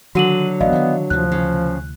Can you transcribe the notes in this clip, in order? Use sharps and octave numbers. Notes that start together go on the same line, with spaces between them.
D3 D#3 F#3 F#4 D#7 F#7
A1 B3 D5 D#5 F5
D#3 E3
D2 C3 E3 F3 F#6
C#3